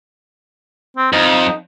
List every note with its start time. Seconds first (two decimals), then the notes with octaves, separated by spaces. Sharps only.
0.97 C4
1.13 F2 D#4